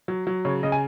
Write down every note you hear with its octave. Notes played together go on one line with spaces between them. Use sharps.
F#3
F#3
C#3 C#5
C#3 D#5
G#5